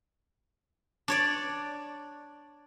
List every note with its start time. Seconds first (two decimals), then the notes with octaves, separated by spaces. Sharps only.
1.08 D4 C#5 D5